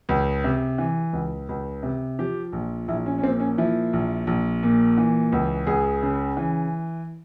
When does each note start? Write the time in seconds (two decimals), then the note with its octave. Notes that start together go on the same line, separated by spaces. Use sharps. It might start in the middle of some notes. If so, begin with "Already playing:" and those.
0.09 C#2
0.44 C3
0.78 E3
1.13 C#2
1.49 C#2
1.83 C3
2.19 F3 G4
2.53 A#1
2.88 A#1 E4
3.06 C#4
3.18 C#4
3.22 A#2 C4
3.40 C#4
3.58 F3 E4
3.93 A#1
4.27 A#1
4.63 A#2
4.98 E3
5.32 C#2
5.67 C#2 G#4
6.03 C#3
6.37 E3